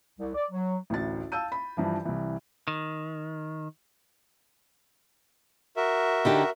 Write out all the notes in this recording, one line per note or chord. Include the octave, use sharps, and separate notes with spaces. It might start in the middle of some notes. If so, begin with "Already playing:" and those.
C2
D5
F#3
A1 D2 A6
F5 A5 E6 G6 D#7
B5
G2 E3 F3
C2 E3
D#3
F#4 A#4 E5
D3 D#4 G4